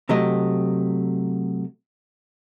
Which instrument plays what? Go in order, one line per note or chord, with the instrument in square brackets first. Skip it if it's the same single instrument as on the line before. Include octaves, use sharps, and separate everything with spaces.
[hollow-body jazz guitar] C3 F#3 A3 G4 D#5